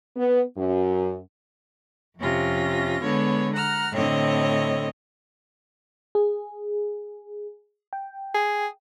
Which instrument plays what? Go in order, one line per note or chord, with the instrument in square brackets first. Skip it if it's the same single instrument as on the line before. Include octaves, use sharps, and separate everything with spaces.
[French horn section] B3
F#2
[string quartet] F2 C3 C#4 F4 A#6
D3 G#3 B3 C#5
F#5 A#5 F6
A2 D3 C4 C#5 D#5
[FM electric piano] G#4
G5
[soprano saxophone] G#4